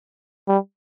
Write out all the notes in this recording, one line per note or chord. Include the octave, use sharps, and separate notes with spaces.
G3